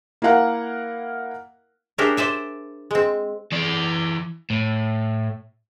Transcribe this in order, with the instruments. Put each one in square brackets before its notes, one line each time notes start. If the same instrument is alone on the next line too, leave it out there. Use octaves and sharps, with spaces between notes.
[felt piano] A#3 E4 A#4 F5 F#5
[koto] C#4 D4 G4 G#4 A#4 E5
C5 D5 E5 G#5
G#3 C4
[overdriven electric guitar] E3 D5
A2